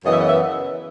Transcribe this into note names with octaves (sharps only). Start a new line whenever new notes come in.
F#2 C#3 E3 B3 D#5
E5
D#5
E5